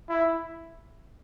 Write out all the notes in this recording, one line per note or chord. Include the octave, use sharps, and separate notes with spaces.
E4